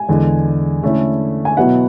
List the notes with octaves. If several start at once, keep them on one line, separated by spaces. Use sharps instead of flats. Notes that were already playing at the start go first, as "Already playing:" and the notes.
Already playing: G#5
E2 D3 G#3
D3 A3 C#4 E4
G#5
B2 F#3 B3 E4 F#5